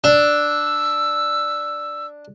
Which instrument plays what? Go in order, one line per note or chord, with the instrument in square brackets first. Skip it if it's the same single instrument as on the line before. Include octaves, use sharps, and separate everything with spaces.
[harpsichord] D4 [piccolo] E6